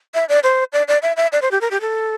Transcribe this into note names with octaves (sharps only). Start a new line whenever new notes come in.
E5
D5
C5
D5
D5
E5
E5
D5
C5
G4
A#4
G4
A4